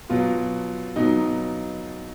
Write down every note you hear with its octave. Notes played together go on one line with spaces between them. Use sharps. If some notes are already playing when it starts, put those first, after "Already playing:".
B2 F#3 F4
B2 F#3 D#4